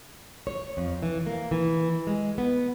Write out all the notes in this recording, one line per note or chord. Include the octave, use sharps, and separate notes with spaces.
C#5
F2
E3
A#3
E3
G#3
B3